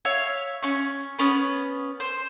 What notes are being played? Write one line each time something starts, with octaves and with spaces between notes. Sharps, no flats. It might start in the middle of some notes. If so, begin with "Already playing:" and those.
C#5 E5 F5
C#4 C#6
B3 C#4 B4
C5